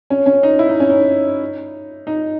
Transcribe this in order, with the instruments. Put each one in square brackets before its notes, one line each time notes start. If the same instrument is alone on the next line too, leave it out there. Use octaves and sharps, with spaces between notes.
[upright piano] C#4
C#4
D#4
E4
D#4
C#4
D#4
D#4